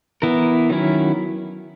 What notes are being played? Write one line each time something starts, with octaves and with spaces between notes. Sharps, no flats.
E3 B3 E4 A#4
D#3 F#3 C#4 E4